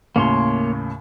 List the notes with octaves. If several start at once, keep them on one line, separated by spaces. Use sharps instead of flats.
D#2 A2 C#3 A#3 C#5 C6